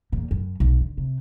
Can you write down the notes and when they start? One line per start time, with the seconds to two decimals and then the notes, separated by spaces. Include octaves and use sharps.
0.12 E2 A#2
0.31 F#2
0.60 B1
0.81 D3
0.98 C3